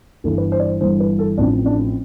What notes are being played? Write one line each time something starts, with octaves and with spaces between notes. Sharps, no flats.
G1 G2 E3 A4
B4
C5
D5
C5
G1 G2 E3 C5
B4
A4
A1 A2 F3 C4 D4
D4